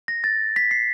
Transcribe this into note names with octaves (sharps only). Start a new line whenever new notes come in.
A#6
A6
B6
C7